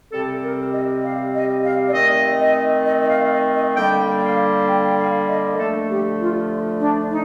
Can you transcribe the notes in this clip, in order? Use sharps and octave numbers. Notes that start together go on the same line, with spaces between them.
C3 G3 C4 A4
A#4
D#5
F5
D#5
F5
D5
D#3 A3 C4 D#5
D#5
D#5
D#5
F5
D#5
D#5
D3 G3 A#3 G5
F5
G5
G5
F5
D#5
A#4
D3 F3 A3 A4
G4
F4
D4
D#4